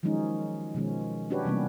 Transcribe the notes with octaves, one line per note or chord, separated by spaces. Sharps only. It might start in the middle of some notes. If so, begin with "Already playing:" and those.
D#3 F3 F#3 G#3 C#4 D#4
B2 D#3 F3 G#3 C#4
C#4 D4 F#4 G4 B4 C#5
C3 E3 G3 A#3 B3 C#4